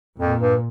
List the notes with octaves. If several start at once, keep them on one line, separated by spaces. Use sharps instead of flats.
F2 A#2
G2